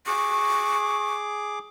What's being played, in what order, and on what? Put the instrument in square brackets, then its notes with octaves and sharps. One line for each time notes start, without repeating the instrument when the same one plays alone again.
[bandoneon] G#4 D6 [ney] C#6